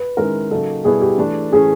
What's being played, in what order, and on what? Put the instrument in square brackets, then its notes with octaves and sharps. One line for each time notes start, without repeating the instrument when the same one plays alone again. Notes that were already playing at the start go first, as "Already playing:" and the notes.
Already playing: [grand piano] B4
[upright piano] D#3 G#3 C#4 E4 [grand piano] A#4
[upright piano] C#3 F#3 A#3 D#4 [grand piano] A4
[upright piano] B2 G3 B3 E4 [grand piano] G#4
[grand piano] G4
[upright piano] E3 A3 D4
[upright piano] E3 A3 C#4 [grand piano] G#4